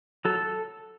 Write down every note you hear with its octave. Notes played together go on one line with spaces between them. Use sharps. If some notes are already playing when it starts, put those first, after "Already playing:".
F#3 A4